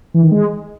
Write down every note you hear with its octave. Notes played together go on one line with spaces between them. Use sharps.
E3
D#3
G#3